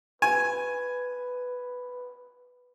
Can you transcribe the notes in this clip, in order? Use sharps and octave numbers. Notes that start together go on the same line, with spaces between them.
B4 G#5